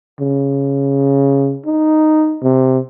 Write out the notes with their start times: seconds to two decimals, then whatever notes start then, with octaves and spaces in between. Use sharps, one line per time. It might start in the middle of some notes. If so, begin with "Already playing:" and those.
0.20 C#3
1.66 D#4
2.43 C3